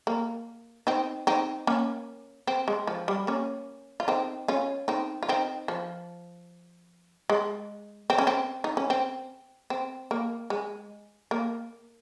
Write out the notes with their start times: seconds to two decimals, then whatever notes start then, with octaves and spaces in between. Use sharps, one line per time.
0.07 A#3
0.87 C4 D#4
1.27 C4 D#4
1.67 A#3 C#4
2.47 C4
2.68 G#3
2.87 F3
3.08 G3
3.27 A#3 C#4
4.00 F4
4.08 C4 D#4
4.48 C#4 F4
4.88 C4 D#4
5.23 F4
5.29 C4 D#4
5.68 F3
7.30 G#3
8.10 C4
8.18 C#4
8.27 C4
8.64 D#4
8.77 C#4
8.90 C4
9.70 C4
10.11 A#3
10.50 G#3
11.31 A#3